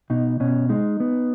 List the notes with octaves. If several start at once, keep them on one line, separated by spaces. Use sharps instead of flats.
B2 D#4
B2 C#4
G#3 D#4
B3